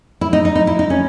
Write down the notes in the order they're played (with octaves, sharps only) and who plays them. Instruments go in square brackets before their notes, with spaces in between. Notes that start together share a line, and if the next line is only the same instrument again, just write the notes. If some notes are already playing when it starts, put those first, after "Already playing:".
[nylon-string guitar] E4
D#4
D#4
D#4
E4
D#4
C#4